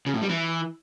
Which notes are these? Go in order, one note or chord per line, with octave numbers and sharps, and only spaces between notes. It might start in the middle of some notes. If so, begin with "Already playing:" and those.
C#3
A2
G3
E3